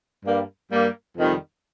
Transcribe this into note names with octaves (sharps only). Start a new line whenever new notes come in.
G2 G3 A#3
G2 G3 A#3
F2 C3 D#3 G3